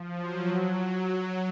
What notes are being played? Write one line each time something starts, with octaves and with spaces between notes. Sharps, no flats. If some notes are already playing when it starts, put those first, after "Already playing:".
Already playing: F3
F#3
F#3